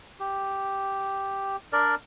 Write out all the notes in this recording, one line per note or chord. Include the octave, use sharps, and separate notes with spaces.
G4
D4 A#4 D5